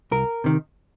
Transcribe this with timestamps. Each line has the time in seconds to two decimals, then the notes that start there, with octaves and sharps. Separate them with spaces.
0.11 C2 A#4
0.44 C3 D#3